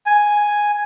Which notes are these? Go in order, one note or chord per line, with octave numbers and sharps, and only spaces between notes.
G#5